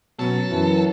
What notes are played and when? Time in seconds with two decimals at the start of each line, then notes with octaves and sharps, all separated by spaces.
0.19 B2 F#3 B3 C#4 A4
0.51 F#2 E3